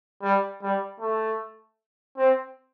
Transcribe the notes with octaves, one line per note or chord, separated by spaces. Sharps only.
G3
G3
A3
C4